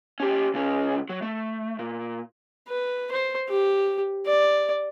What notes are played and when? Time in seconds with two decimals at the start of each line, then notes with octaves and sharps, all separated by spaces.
0.20 C#4 G4
0.54 C#2 C#4
1.09 F#3
1.22 A3
1.79 A#2
2.68 B4
3.12 C5
3.49 G4
4.27 D5